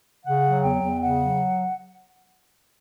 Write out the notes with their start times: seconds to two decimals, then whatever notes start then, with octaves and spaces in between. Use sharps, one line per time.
0.25 C#3 F#5
0.44 F#3
0.63 E2 G5
0.82 E2
1.01 C#3 F#5
1.20 F#3